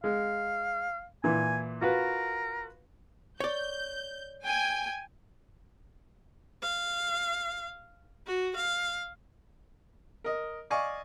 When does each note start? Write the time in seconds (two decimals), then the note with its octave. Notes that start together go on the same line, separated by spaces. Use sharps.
0.04 G#3 F5
1.24 A#2 E3 G#5
1.81 F4 F#4 A#4 B4
3.40 C#5 D5 G6
4.44 G5 G#5
6.62 F5
8.27 F#4
8.56 F5
10.24 A#4 D#5
10.70 D5 D#5 F5 G#5 C#6